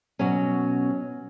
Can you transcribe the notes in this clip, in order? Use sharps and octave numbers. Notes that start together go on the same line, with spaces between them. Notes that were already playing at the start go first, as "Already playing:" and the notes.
B2 F#3 C#4